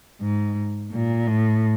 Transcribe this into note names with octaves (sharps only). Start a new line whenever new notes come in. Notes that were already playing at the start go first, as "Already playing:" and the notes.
G#2
A#2
A2